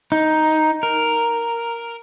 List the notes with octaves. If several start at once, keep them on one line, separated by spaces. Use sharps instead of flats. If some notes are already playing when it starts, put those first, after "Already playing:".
D#4
A#4